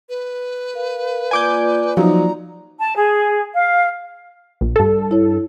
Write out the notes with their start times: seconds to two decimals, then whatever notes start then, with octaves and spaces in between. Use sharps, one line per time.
0.09 B4
0.74 A#4 F5
1.31 A#3 F4 D5 G#5 D6 G6
1.97 F3 F#3 D#4 A#5
2.78 A5
2.95 G#4
3.53 F5
4.61 A#1
4.76 G2 A4
5.11 E4 C#5